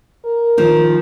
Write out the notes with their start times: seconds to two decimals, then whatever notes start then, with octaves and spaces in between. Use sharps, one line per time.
0.24 A#4
0.58 D#3 F3